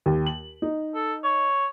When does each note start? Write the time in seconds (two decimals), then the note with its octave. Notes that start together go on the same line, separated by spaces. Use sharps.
0.06 D#2
0.26 F#7
0.62 D#4
0.95 A4
1.24 C#5